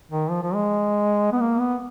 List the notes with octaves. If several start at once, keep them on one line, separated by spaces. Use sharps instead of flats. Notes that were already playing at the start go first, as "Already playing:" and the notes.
D#3
F3
F3
G#3
B3
A#3
B3